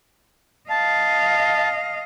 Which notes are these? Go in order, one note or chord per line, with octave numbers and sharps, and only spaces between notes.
D#5 F5 A5